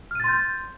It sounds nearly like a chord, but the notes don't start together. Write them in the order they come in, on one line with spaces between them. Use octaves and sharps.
F6 D#7 A6 C6 G6